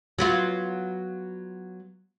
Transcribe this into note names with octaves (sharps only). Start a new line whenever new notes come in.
F#3 B3 F4